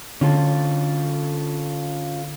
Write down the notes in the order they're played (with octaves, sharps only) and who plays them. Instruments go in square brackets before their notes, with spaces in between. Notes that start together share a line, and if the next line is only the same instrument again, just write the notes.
[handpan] D3 [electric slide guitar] C#4 F4 A4